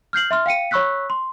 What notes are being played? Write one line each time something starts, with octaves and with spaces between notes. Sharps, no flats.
F6 G6 C7 F#7
E5 C6 F6
F5 G5 C#7 D#7
C#5 B5 C#6 E6 F#6 B6
C6